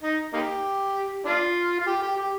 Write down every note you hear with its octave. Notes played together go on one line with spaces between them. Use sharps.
D#4
A#3 D#4 G4
D4 F4
F4
G4
G4
G4